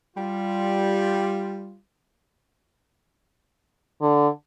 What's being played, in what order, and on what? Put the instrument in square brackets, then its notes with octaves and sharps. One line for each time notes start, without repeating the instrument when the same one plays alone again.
[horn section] G3 F4
[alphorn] D3